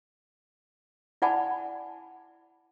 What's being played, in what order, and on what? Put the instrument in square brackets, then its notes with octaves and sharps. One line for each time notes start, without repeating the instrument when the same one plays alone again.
[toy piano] E4 D5 F#5 G#5 A5 B5